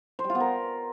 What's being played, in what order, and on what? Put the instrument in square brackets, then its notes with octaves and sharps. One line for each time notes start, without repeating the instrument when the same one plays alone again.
[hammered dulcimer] C5
G3
F4
B3
A#4